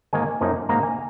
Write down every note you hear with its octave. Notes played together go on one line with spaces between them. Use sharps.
G#2 D#3 A#3 G#5
F#2 F3 A#3 D#4
G#2 D#3 A#3 D#4 A#5
G#5